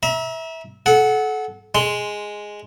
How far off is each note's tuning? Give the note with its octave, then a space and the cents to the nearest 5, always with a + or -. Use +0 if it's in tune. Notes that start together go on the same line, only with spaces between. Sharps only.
E5 -20 A#5 +35
A4 -30 F#5 +0
G#3 +0 C6 -5